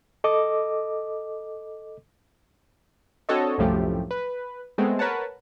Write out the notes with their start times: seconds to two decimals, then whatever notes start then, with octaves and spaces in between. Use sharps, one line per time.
0.24 A4 D#5 D6
3.29 C4 D4 F#4 A4 C#5 D#5
3.58 C2 F#2 A2 F3 A3 G4
4.11 B4
4.78 G#3 A3 B3 C4
4.99 A#4 B4 C#5 F#5 A5